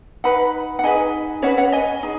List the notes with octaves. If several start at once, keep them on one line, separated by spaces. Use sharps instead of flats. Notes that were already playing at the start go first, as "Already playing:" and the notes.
D#4 B4 F#5 B5
F#5
D#4 G#4 B4 D#5 G#5
C#4 B4 C#5 F#5
C#5 F#5
D#5 G#5
D#4 G#4